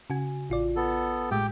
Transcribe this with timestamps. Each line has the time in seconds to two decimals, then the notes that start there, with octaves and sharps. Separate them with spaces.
0.10 C#3 F#4 G#5
0.50 A1 F4 D5
0.76 B3 A4
1.31 A2 G#3 G4 G5